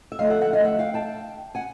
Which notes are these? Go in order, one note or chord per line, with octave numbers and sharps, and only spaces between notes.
E5
F#2 D3 F3 A3 D#5 F5
E5 F#5
E5 F#5
D#5 F5
E5 F#5
F5 G5
G5 A5
F#5 G#5